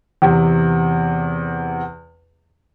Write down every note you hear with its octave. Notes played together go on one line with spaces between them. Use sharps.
E2 C3